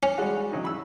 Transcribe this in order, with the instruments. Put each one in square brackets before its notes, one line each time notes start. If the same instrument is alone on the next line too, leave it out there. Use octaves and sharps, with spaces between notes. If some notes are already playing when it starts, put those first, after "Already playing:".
[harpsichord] C#4
[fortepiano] G3 G#3 F#4
C#3 F#3 D#4
B5 E6